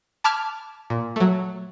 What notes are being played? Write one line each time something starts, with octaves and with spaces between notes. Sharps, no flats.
A5 B5 D6 F6 F#6 G#6
A#2
F#3 A3